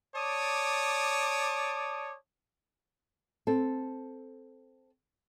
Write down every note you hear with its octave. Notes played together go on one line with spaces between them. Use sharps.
C#5 D5 A5 D6 D#6
C4 A4